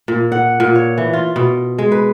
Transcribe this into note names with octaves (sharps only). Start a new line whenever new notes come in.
A#2
F#5
A#2
C#5
E3
F4
B2
G#3
B4